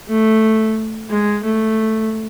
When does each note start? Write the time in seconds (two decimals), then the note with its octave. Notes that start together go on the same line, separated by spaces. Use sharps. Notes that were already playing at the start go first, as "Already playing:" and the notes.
0.08 A3
1.10 G#3
1.43 A3